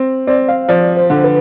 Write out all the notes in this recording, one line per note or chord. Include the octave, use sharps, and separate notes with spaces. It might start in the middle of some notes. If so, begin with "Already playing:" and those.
Already playing: C4
C4 D5
F5
F3 D5
C5
D3
B4